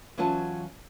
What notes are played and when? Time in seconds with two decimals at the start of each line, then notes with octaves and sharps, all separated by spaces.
0.17 E3 F#3 C#4 F4 F#4 A5